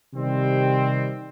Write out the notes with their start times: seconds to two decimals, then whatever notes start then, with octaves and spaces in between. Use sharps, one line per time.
0.13 C3 D#3 G3 C4